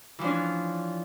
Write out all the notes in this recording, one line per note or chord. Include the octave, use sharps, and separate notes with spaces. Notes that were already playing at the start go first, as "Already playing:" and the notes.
E3 F3 C#4 D4